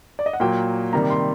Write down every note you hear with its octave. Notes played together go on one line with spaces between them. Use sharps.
D5
D#5
F#5
A#2 F#3 A#3 G5
C3 D#3 G3 A#3 A#5
C6